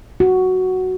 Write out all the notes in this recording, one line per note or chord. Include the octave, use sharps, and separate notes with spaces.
F#4